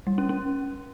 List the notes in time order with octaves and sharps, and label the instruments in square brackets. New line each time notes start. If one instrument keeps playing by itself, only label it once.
[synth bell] G3
C#4
C#4